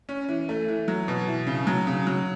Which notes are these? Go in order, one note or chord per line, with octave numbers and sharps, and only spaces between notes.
C#4
E3
A3
E3
F#3
B2
E3
C#3
F#3
C#3
F#3